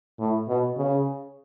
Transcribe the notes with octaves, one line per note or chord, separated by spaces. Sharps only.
A2
B2
C#3